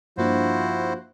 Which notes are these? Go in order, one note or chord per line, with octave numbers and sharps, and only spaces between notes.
G2 F3 A#3 D4 E4 F#4 C5